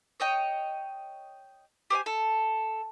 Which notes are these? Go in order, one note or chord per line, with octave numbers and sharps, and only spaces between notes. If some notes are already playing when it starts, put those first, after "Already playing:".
C#5 D#5 G5
G4 C5 D#5 G#5
A4